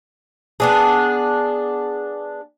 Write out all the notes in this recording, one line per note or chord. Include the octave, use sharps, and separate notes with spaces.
B3 D4 G#4